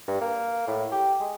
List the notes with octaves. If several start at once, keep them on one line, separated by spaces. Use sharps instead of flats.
G2
A#3
A2
G4
G#3